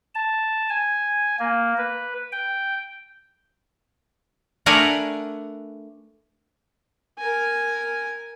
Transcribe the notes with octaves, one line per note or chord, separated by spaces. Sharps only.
A5
G#5
A#3
B4
G5
A3 D4 A#4 B4 F#5 G#5
A#4 G#5